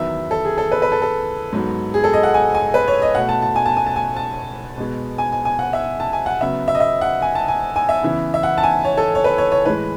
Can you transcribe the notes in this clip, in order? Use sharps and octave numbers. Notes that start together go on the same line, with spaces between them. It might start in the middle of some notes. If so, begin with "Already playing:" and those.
Already playing: E2 D#3 F#3 B3 E5
A4
G#4
A4
B4
B4
A4
A4
G#2 F#3 B3
G#4
A4
D#5
F#5
G#5
G#5
B4
C#5
D#5
B2 A3 F#5
A5
A5
G#5
A5
G#5
A5
G#5
A5
B2 G#3 B3
G#5
G#5
G#5
F#5
E5
A5
G#5
F#5
C#3 F#3 B3 E5
E5
D#5
E5
F#5
G#5
A5
G#5
G#5
E5
C#3 E3 B3
E5
F#5
A5
G#5
C#5
A4
C#5
B4
C#5
C#5
A2 E3 G#3 B4